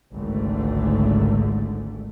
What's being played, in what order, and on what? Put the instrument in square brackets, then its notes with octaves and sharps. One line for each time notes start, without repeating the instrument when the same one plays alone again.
[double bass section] G#1 C#2 G#2 D3 A3